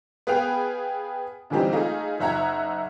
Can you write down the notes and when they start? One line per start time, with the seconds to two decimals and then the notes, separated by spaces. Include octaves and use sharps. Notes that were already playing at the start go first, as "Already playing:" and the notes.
0.27 B3 G#4 B4 F5 G5 F7
1.50 A#2 D3 E3 G3 C4 D#4
1.72 A3 D#4 F4 G#4
2.20 F#1 D#4 E5 F#5 A#5 G#6